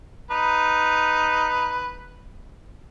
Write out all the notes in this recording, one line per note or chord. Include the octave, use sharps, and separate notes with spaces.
D#4 B4